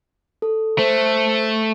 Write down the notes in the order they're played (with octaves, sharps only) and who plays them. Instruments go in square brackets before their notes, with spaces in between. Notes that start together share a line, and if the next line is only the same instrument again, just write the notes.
[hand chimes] A4
[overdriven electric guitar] A3 [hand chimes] C5